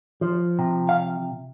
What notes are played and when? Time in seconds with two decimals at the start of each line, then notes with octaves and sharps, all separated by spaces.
0.21 F3
0.59 C3
0.89 F5